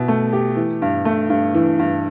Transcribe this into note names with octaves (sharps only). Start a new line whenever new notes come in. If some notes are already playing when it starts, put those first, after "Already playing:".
Already playing: B2 E4
A3
G4
E3
G2
A3
G2
E3
G2